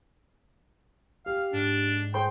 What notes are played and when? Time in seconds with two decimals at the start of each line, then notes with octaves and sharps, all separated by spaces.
1.26 G4 F5
1.53 G#2 D4
2.14 G#4 C5 G5 C6